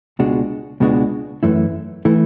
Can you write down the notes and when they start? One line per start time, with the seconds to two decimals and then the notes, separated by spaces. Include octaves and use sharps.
0.19 C#2 B2 G#3 D4 F#4
0.80 C#2 B2 G#3 D4 F#4
1.43 F#2 E3 A3 E4
2.05 E3 A3 E4